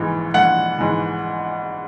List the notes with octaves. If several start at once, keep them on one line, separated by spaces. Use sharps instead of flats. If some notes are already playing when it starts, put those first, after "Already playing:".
Already playing: A#1 G#2 E3
A#1 F#5
G#2 E3